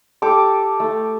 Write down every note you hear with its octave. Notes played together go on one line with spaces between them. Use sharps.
G4 A4 D6
A3